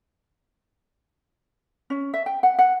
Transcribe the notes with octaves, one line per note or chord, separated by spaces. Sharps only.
C#4
E5
G5
F#5
F#5